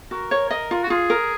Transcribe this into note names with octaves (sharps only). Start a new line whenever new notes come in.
F#4 A#4
C#5
D#5
F4
F#4
F4 G#4
A#4